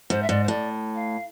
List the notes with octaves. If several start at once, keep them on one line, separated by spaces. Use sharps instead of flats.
G#2 C5
E5
G#2 D5
C5
A2 D5
F5